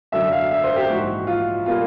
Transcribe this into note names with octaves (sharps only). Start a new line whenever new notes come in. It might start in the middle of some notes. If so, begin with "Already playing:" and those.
F#2 D3 F#3 E5
F5
E5
C5
G4
A#1 G#2 E3 F#4
F4
B2 G3 A#3 F4